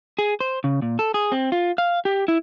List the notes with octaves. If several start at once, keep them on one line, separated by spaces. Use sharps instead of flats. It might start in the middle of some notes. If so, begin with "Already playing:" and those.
G#4
C5
C#3
A#2
A4
G#4
C4
F4
F5
G4
E4